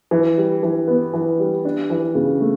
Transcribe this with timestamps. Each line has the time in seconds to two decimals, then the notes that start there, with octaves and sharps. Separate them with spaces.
0.11 E3
0.38 G3
0.63 E3
0.87 B3
1.14 E3
1.40 G3
1.65 D4
1.90 E3
2.15 C#3
2.41 A3